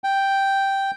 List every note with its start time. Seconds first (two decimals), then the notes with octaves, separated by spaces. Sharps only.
0.04 G5